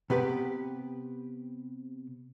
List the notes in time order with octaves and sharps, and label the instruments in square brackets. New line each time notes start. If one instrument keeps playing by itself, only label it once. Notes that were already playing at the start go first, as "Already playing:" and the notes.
[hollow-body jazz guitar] C3 B3 G4 B4